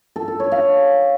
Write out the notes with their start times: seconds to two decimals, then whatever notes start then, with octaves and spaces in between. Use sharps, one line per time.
0.16 A4
0.28 A4
0.40 C#5
0.52 F5